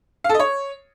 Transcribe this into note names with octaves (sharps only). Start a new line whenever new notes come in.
F5
A4
D#5
C#5